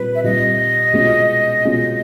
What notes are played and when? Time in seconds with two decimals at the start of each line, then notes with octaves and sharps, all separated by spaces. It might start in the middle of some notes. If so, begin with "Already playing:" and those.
Already playing: A#2 G3 C4 F4 B4
0.14 E5
0.23 A#2 G3 C4 F4 D#5
0.93 B2 G#3 C#4 F4
1.64 B2 G#3 C#4 F4